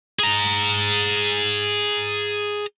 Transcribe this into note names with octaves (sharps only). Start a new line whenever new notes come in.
G#4 A#5